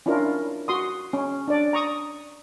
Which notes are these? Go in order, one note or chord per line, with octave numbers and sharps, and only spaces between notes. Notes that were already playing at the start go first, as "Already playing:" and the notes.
C#4 D4 E4 F4 A#4
F#4 C6 D#6
C#4
D4 D5
A#5 C#6 D#6